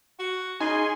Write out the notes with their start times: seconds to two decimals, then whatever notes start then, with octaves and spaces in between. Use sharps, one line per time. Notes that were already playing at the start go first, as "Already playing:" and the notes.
0.19 F#4
0.60 C#3 D#4 G#4 G#5 C6